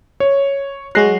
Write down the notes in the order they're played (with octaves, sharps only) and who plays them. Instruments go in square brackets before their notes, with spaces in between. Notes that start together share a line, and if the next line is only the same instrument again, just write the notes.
[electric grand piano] C#5
[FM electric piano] F#3 G#3 F#4 [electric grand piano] F#6 A#6 C7